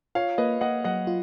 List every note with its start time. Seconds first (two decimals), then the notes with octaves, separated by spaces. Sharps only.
0.15 F4 C#5 F5
0.38 A#3 B4 D#5
0.61 A#3 D#5 F#5
0.84 F#3 D#5 F#5
1.07 F4